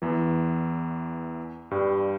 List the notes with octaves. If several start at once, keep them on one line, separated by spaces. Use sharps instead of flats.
E2 E3
G2 G3